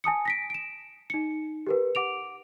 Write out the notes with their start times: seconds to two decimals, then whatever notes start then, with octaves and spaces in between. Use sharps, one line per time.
0.04 G#5 A5 D#6 C#7
0.25 A#6 B6 D7
0.50 D7 E7
1.10 D#4 C#7
1.67 G4 A#4 B4
1.95 F#5 D6 D7 F7